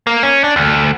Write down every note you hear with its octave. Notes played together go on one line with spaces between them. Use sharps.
A#3
C#4
D4
D2